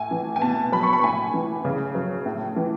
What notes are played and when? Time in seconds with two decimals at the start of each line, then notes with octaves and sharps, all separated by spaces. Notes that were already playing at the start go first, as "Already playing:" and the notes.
Already playing: A2 G#5
0.11 E3
0.36 G#5
0.42 B2 A5
0.72 F#3 B5
0.83 C#6
0.93 B5
1.03 A2 G#5
1.34 E3
1.65 C#3
1.95 F#3
2.26 A2
2.56 E3